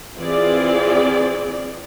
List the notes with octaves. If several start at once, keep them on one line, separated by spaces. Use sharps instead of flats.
E3 C4 F4 G#4 D5